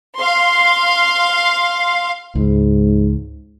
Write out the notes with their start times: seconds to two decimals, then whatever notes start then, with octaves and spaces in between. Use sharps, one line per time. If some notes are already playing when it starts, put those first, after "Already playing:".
0.18 F5 C6
2.35 C#2 G#2